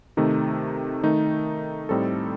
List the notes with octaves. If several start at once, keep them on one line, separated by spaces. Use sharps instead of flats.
C3 D#3 A3 D#4
D#3 A3 D#4
A2 G3 C4 D#4 A4